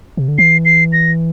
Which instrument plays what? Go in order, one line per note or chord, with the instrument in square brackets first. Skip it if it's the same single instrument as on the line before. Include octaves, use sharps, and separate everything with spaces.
[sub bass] C3
D3
[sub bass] E3 [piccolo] C7
[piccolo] C7
A#6